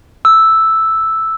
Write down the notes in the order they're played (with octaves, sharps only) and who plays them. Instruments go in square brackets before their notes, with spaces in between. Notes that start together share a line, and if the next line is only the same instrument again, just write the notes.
[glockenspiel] E6